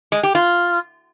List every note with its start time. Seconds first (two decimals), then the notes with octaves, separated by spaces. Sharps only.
0.12 G#3
0.23 G4
0.35 F4